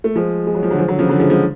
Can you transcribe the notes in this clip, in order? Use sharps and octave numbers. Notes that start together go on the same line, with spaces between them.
A3
F3 G#3
G#3
F#3
F3
D3 F#3
F3 G#3
D3 F#3
C#3 F3
D3 F#3
F3 G#3
F3 G#3